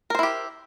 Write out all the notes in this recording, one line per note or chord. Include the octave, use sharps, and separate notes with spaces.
E4 G4 A#4 C5